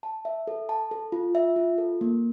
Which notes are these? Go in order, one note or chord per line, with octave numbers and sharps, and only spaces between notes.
A5
E5
A4
A5
A4
F4
E5
F4
A4
A#3